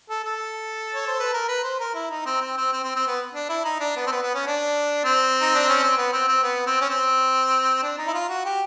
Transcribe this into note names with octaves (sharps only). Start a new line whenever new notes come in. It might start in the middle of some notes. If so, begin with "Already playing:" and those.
A4
A4
C#5
C5
B4
A#4
B4
C5
A#4
E4
D#4
C4
C4
C4
C4
C4
C4
B3
D4
E4
D#4
D4
B3
C4
B3
B3
C#4
D4
C4
D#4
D4
C#4
C4
B3
C4
C4
B3
C4
C#4
C4
D4
D#4
E4
F4
F#4
G4